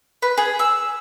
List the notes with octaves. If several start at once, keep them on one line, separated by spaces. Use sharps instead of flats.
B4
G#4
E6